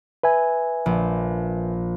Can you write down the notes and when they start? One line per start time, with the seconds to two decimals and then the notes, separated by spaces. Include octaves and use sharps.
0.23 B4 E5 G#5
0.86 A#1